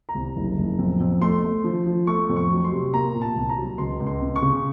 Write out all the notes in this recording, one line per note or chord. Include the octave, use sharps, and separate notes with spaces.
A#5
C2
F#1
F#1
F2
F2
A3 C6
A3
F3
F3
A3 C#6
F2
C#6
F#3
C6
C3
A#3 A#5
A#2
A5
C2
A#5
F#3
C#2 C6
C#2
C6
C#3
C#6
C#3